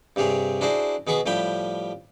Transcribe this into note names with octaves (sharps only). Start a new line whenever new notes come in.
G2 C3 G4 G#4 C#5
D4 E4 F#4 G#4 C5 D5
B2 B3 G#4 B5 C#6 D6
A2 F3 G3 G4 G5 B5